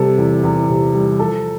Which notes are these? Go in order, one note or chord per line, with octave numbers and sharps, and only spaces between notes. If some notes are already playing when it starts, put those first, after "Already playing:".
Already playing: C3 G3 A4
E2
E2
C3
G3
F3 A4